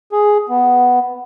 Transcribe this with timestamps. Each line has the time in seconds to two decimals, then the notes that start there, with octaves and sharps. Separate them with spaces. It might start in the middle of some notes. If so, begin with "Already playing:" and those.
0.12 G#4
0.49 B3